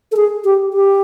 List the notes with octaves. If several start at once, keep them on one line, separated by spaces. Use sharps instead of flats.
A4
G#4
G4
G4